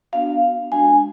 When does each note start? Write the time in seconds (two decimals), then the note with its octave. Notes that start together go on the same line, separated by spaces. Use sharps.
0.13 B3 D4 F#4 F5
0.72 G#3 D4 F#4 G#5